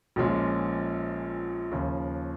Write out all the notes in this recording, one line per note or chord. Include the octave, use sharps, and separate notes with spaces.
A#1 A#2 F3 G#3 C#4
D#2 C#3 F3